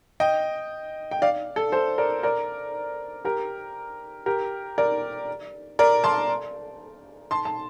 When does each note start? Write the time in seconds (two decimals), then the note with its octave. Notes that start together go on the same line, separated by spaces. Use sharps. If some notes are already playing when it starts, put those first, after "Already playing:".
0.20 D#5 G5
1.11 G5
1.22 D5 F5
1.56 A4
1.72 A4 C5
1.98 A#4 D5
2.23 A#4 D5
3.25 G4 A#4
4.26 G4 A#4
4.78 A#4 D5
5.79 A#4 D5
6.04 A5 C6
7.31 A5 C6
7.45 A5